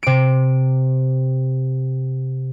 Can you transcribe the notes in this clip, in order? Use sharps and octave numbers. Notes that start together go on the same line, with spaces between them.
C3 D7